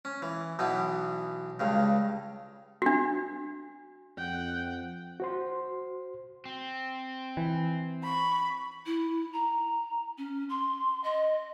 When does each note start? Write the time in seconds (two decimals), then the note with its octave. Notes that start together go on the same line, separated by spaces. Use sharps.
0.05 C#4
0.22 E3
0.59 B1 B2 E3 B3
1.60 C#2 G2 C#3
2.82 D4 F#4
4.17 F2 F#5 G5
5.20 F#4 C5 C6
6.46 C4
7.37 E3
8.04 B5 C#6
8.85 E4
9.32 A#5
10.17 C#4
10.49 C6
11.03 D#5